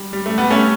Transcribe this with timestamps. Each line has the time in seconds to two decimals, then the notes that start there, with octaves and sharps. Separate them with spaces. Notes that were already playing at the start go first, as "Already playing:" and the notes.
Already playing: G3
0.13 G3
0.26 A3
0.38 G3 B3
0.50 A3 C#4